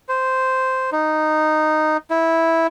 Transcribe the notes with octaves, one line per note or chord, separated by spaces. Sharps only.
C5
D#4
E4